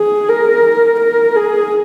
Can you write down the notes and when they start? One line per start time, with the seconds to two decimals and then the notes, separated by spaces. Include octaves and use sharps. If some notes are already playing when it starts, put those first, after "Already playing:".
Already playing: G#4
0.29 A#4
1.00 A#4
1.36 G#4